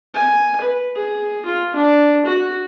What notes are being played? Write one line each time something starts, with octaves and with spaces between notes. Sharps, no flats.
G#5
B4
G#4
F4
D4
F#4